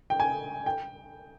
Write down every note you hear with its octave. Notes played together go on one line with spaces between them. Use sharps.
G5
G#5
G5